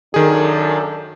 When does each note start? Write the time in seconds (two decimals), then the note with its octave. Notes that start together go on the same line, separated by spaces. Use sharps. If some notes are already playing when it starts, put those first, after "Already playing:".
0.14 F#2 D#3 D4 G#4 A4